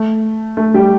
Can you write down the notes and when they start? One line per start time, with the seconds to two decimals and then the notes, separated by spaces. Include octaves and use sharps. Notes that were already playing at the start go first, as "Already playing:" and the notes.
Already playing: A3
0.57 A3
0.74 G3 G4